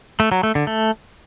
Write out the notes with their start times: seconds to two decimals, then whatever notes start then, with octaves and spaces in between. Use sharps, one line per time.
0.20 A3
0.32 F#3
0.43 A3
0.55 D3
0.67 A3